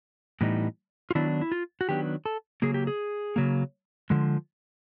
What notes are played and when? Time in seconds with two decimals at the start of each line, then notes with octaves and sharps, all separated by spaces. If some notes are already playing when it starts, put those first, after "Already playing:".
0.41 A2 E3 G3 B3 D#4
1.11 F4
1.15 D#3 F#3 B3 D4 E4
1.41 E4
1.52 F4
1.81 F#4
1.89 D#3 F#3 B3 D4 G4
2.26 A4
2.62 C#3 F#3 A#3 G#4
2.74 G4
2.87 G#4
3.36 C#3 F#3 A#3
4.10 D3 F3 G#3